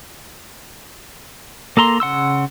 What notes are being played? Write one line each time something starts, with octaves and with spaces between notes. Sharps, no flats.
A#3 A4 A#5 C6
C#3 F#5 C6 E6